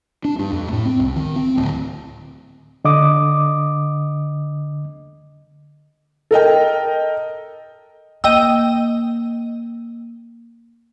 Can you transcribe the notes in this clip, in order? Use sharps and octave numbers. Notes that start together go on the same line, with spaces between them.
D4
G2
F2
A2
C4
C2
D#3
C4
D1
D3 D#5 D6 D#6
A4 A#4 D#5 G5
A#3 D#5 G5 E6